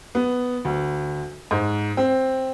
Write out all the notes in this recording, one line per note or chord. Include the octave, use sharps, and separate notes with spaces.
B3
D2
G#2
C4